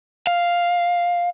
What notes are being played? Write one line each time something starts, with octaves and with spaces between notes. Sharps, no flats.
F5